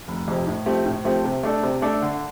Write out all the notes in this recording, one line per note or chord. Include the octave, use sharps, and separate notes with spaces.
F1
F2 C3
A2
F3 A3 C4 G4
A2
F3 A3 C4 G4
C3
A3 D4 A4 D5
C3
A3 D4 A4 D5
D3